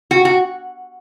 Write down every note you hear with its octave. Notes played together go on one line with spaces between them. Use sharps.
F#4
F#4